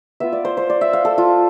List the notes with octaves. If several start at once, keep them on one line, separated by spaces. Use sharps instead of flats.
B3 F4 E5
D5
C5
C5
D5
E5
F5
A4
F4